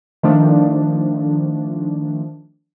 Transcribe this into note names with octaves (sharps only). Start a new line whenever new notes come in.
D#3 F3 A3 D4